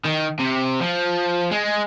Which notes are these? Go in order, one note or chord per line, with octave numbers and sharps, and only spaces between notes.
D#3
C3
F3
G#3